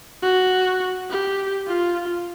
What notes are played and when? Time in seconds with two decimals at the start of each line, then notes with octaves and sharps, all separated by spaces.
0.23 F#4
1.10 G4
1.68 F4